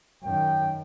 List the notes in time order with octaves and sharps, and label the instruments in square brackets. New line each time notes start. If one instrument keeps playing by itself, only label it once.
[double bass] F#2 D#3 [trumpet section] G5